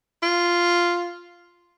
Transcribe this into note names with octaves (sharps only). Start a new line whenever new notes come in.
F4